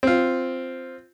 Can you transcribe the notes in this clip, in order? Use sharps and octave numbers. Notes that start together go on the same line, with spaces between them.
C4 F4